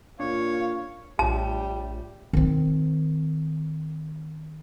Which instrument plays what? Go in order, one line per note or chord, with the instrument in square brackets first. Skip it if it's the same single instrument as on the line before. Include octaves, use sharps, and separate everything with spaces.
[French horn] A#2 [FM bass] D4 [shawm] C#5 [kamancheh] F5
[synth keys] A#1 A2 [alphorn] G3 [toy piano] A5
[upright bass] D#3 C4